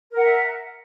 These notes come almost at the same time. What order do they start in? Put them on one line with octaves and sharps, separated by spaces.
A#4 F#5 E5